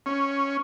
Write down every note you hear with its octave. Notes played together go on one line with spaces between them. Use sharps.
C#4